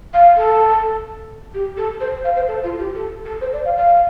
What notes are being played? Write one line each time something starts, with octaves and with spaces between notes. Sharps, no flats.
F5
A4
G4
A4
C5
F5
C5
A4
F4
G4
A4
A4
C5
D5
F5
F5